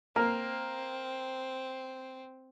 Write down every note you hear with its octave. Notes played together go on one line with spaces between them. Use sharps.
A#3 C4